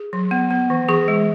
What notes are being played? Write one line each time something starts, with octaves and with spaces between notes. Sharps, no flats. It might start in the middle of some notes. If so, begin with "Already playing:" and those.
Already playing: G#4
F#3
B3
B3
E3
E3 G#4
G#3